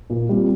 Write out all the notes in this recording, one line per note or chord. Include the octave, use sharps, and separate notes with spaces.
A#2
G3 C4 F4